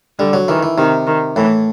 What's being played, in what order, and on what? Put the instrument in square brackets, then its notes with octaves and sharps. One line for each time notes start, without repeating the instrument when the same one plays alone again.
[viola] D3 [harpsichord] G3
[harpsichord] F#3
[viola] D#3 [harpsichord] E3
[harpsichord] E3
[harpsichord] C3 [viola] D#3
[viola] D#3
[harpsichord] A2 [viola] E3